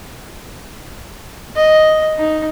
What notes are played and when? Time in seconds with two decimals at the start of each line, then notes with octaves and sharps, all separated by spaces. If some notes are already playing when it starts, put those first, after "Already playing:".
1.55 D#5
2.18 D#4